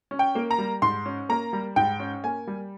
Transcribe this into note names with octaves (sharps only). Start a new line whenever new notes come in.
C#4
G5
A#3
A#5
G3
G#2 C6
C#4
A#3 A#5
G3
G#2 G5
C#4
A#3 G#5
G3